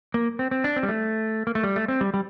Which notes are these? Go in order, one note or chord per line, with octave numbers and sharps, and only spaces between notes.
A#3
C4
C4
D4
C4
G3
A3
A#3
A3
G3
A3
C4
G3
G3